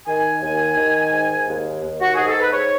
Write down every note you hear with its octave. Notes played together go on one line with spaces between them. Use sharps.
D#3 G#5
D#2
D#3
G#2
D#2
D#2
F#4
G#2 G#4
A4
B4
G#2 C#5